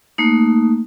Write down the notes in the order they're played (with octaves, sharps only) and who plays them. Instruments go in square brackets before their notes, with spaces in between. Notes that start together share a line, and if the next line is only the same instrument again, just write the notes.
[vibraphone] A3 A#3 D#4